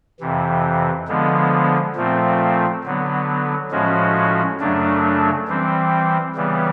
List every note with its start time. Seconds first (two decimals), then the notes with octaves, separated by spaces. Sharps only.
0.20 F2 C3 E3
1.08 D3 F3 G#3 B3
1.96 A#2 F3 A3 C4
2.84 D3 F#3 B3
3.71 A2 F3 G#3 C#4 F#4
4.60 F#2 C#3 F#3 A3 D4
5.48 E3 G3 C4
6.36 C#3 E3 G3 B3